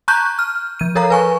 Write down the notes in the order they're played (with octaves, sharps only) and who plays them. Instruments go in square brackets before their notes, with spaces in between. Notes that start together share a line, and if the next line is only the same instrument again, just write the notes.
[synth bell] A5 A#5 C#6 F#6 G6
F6
F3 D#7
A4 A#4 C#5 F5 A#5
B4 G#5 C#6